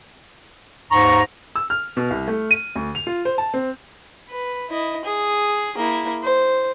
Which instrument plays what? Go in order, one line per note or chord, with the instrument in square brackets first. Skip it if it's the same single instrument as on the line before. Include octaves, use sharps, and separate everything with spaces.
[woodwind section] D#2 G#2 A#5 [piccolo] C#6
[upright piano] E6
F6
B2
C2
A3
D#7
D2
F7
F4
C5
A5
C4
[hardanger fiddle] B4
E4 D#5
G#4
A#3 E4
C5